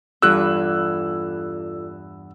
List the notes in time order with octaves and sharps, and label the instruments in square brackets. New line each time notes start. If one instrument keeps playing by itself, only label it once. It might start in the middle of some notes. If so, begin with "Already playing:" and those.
[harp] E2 G2 E3 [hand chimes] F4 A4 D5 [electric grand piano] E6 F#6